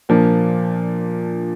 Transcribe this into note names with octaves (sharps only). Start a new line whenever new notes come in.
A#2 F3 A#3 D4